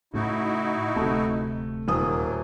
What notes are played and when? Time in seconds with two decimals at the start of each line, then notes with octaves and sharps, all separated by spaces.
0.14 A2 C#3 D#4 E4 F#4
0.96 D1 C3 A3
1.88 D#1 F#3 A#3 D#6